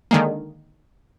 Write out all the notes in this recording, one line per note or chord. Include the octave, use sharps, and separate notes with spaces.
D3 D#3 G#3 A#3